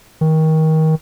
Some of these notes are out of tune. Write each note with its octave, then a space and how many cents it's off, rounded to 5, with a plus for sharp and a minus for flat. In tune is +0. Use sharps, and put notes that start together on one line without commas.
D#3 +25